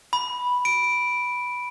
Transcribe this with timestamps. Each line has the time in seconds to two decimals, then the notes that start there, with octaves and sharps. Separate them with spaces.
0.13 B5
0.65 D7